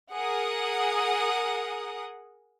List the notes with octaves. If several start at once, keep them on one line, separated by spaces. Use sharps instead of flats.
G#4 A#4 F#5 D#6